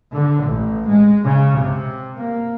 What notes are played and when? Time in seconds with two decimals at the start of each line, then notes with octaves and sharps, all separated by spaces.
0.13 D3
0.45 A1
0.88 G#3
1.23 C#3
1.59 C3
2.17 A#3